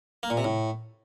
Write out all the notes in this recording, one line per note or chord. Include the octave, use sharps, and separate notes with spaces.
A#3
A#2
C3
A2